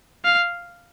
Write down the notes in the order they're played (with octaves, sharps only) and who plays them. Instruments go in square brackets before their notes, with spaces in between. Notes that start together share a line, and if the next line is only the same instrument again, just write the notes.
[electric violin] F5